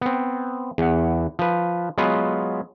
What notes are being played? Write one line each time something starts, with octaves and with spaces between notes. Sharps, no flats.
B3 C4
E2 F#5
F3 B4
F#3 G#3 B3 F4 B4